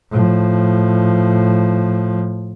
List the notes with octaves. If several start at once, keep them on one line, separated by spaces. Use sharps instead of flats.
A2 F3